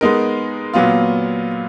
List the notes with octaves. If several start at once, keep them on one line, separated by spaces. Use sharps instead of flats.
G#3 B3 D#4 A#4
A#2 F#3 B3 F4